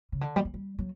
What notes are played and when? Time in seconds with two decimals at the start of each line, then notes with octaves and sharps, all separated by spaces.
0.12 C#3
0.21 D3
0.36 G3
0.45 F#3
0.54 G3
0.79 F#3